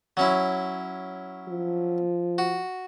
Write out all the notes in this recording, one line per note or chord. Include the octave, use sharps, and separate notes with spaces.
F#3 C#4 E4
F3
F#4